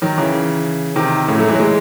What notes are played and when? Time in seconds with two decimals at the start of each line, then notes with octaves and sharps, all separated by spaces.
0.02 D#3 F#3
0.18 C#3 E3
0.96 C3 D#3
1.28 A2 C#3
1.38 F#3 A3
1.49 E3 G#3
1.55 F#3
1.60 E3 G#3